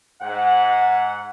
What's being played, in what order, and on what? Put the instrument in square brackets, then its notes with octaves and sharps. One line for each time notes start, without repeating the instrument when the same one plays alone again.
[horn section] G#2 F#5